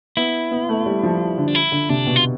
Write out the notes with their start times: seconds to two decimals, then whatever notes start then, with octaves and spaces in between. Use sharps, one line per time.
0.17 B3 E4
0.52 B3
0.69 A3
0.86 G3
1.03 F3
1.38 D3
1.48 D4
1.55 E4
1.72 D3
1.89 C3 D4
2.07 B2
2.16 F4